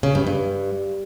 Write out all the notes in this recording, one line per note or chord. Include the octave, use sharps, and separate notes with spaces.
C#3
G2
G2